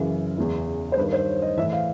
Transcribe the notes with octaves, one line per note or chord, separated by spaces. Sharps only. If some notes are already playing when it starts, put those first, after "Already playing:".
Already playing: F#2 C#3 E3
E2 C#3 E3
C5
G2 D#3 B4
C5
C#5
D#5
A2 E3 E5
F5